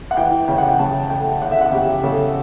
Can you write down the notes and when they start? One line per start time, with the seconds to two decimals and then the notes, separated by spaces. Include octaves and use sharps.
0.11 F#5
0.17 E3 G5
0.48 C#3 G5
0.58 F#5
0.69 G5
0.79 C#3 A5
1.10 A3 G5
1.42 C#3 F#5
1.51 E5
1.61 F#5
1.72 C#3 G4
2.03 C#3 A4